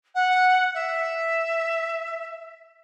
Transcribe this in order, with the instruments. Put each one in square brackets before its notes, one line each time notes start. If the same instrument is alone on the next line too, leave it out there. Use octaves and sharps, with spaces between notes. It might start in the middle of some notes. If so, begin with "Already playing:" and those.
[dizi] F#5
E5